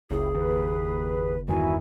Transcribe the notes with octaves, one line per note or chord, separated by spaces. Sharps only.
F#1 C#2 E4 G4 G#4
D#2 B4
G1 E2 D#3 E4 F#4 G#5